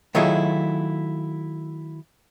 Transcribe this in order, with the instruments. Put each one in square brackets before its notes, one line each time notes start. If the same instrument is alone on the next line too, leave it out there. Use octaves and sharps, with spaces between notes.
[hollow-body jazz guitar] D#3 F#3 A3 E4 F4 G#4